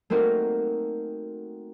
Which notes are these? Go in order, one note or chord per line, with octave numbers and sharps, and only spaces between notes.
A3 A#3 C4 D#4 F#4 A#4